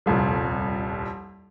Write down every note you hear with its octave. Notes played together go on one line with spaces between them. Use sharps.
D#1 C2 F2